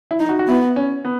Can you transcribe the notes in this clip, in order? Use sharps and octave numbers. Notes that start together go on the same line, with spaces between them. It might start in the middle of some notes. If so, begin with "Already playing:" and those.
E4
D#4
F#4
F#4
B3 E4
C#4
B3